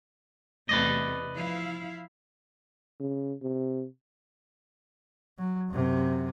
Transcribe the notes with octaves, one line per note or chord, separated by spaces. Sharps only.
E2 C3 A3 B4 D5 D#5
F3 E4 F5
C#3
C3
F#3
F#2 C3